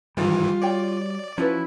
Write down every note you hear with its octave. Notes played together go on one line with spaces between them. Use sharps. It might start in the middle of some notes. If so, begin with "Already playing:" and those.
G#2 D#3 E3 G3 F4
F#4 C#5 D5 G5
F3 C#4 E4 F#4 B4